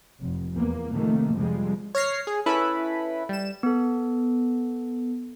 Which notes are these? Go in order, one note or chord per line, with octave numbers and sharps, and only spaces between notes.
F1
E2 A#3
C3 D#3 F3 A3 A#3
F2 C3 F3 G3 G#3 C4
C#5 F6 A#6 C7
G#4
C#4 E4 A4 B4 B5
G3 E7
B3 A4